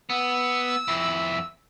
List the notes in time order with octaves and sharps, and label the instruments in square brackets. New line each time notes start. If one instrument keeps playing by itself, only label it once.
[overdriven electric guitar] B3 [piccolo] E6
[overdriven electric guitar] F2 E4